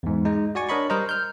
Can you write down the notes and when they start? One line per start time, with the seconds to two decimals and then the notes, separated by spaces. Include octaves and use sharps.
0.03 E2 G#2
0.25 G#3 D#4
0.55 F#4 D5 G#5 C#6
0.69 D4 A#4 C#5 D#5 B5 C#6
0.90 G3 A#4 C5 D#5 A#5
1.09 F6 G6